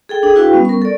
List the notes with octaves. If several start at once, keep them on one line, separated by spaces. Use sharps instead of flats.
G#4 A4 G5
D4 G#4
E4 F#4 B4 F5 G5
G3 B3 C#4
A#4 C#6
A4 D5